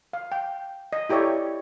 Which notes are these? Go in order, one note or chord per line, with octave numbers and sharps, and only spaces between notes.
F5
G5
D#5
E4 G4 A4 C#5 D5